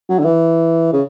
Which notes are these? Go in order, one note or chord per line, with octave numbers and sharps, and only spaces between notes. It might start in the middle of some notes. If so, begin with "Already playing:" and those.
F#3
D3
E3
C#3